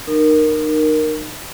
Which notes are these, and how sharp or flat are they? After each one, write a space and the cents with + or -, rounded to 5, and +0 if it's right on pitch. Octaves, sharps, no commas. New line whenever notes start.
D#4 -30 A#4 +0